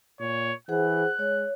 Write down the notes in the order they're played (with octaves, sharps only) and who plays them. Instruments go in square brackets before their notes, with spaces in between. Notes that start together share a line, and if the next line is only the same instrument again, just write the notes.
[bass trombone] A#2 [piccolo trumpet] C#5
[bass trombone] E3 [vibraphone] G#4 C5 F#5 [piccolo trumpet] F#6
[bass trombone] G#3 [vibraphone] C#5